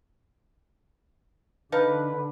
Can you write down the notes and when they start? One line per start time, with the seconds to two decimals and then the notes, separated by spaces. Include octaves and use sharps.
1.72 D3 D#4 B4 F5 A5